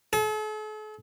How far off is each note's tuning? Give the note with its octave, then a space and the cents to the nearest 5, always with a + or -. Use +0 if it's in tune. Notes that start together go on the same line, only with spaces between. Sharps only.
A4 -45